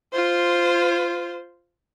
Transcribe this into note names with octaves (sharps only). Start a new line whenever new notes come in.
F4 C5